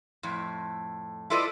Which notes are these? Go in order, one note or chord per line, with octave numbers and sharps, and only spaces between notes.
F2 A2
E4 F4 A4 B4 D5 D#5